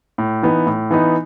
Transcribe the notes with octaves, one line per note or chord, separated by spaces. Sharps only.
A2
E3 B3 D#4
A2
E3 B3 D#4